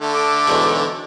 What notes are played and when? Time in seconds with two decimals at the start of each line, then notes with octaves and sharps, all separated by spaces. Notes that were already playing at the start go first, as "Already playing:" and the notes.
0.01 D3 A3
0.14 D6
0.48 B1 E2 G#2